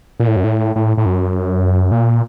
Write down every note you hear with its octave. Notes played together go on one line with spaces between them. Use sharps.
A#2
A2
F#2
A2
A2
A2
F#2
A#2